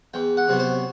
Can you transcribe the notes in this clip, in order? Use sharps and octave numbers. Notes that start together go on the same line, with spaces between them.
E2 G5
F#5
C3 F#3 B3
C5